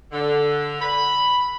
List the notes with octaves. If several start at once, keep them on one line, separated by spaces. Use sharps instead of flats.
D3
B5